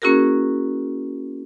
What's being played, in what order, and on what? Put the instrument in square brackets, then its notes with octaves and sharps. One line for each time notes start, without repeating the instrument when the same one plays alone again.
[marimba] A#3 C#4 E4 F#4 G#4 A#4